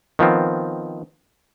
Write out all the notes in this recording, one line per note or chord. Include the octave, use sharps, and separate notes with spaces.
D#3 F3 B3 C4